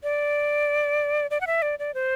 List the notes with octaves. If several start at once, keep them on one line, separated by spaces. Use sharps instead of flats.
D5
D5
F#5
E5
D5
D5
C5